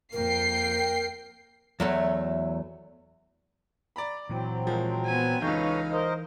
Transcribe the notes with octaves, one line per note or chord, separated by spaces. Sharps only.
F2 A#3 A#4 G5 C7
E2 F#3 A3
D5 A#5 B5
A#2 E3 F#3 C4
F3 G#3 A#4
B3 G#5
C#2 E3 D#4 A4 B4 C#5 F5 G6
A#4 C5 D#5